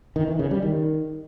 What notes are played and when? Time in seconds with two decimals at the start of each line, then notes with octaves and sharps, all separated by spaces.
0.16 D#3
0.28 E3
0.39 C#3
0.51 G3
0.63 D#3